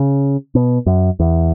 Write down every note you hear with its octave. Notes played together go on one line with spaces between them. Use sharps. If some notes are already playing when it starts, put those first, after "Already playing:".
Already playing: C#3
B2
F#2
E2